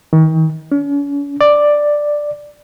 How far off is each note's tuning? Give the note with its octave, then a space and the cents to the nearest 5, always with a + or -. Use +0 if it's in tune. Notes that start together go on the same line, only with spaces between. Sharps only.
D#3 +40
C#4 +40
D5 +5